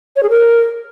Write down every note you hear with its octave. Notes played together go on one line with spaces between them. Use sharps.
C#5
G#4
A#4